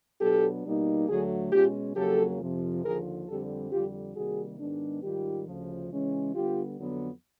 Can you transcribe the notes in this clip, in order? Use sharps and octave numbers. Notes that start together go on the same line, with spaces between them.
B2 F#3 B3 D4 G4 A4
B2 G3 A#3 D#4
D2 D3 F#3 A3 F#4 G#4
B2 G#3 C#4 F4 G4
F2 C#3 F#3 A#3 G4 A4
F2 C3 F3
D#2 D3 F3 G#4 A#4
F2 D3 G3 C4 G4 A4
F2 D3 G3 F4 G4
C3 D#3 G3 A#3 F#4 G#4
G#2 D#3 G#3 B3 D4
G#2 D#3 G3 F4 G4
D2 C#3 F3
C#3 E3 G#3 C#4
D3 G3 B3 F4 G4
F2 D3 F#3 B3